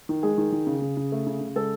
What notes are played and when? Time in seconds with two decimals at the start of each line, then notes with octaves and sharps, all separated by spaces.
0.09 D#3
0.23 G#3 G#4
0.38 D#3
0.52 D#3
0.67 C#3
0.82 C#3
0.97 C#3
1.12 A3
1.27 C#3
1.41 C#3
1.56 G#3 A4